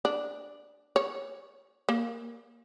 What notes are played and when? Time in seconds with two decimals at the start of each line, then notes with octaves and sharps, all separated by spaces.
0.05 D4
0.96 C#5
1.89 A#3